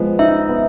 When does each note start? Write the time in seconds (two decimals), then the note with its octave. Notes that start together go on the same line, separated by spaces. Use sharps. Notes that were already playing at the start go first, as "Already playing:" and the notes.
Already playing: F3 G#3 B3
0.19 D#4 E5
0.49 B3